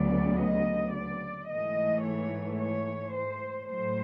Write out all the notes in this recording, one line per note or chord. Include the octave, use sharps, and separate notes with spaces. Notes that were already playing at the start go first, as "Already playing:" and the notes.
Already playing: D2 C#3 F#3 B3 D5
D#5
D5
G#2 E3 A3 D#5
C#5
C#5
C5
A2 F#3 A3 C5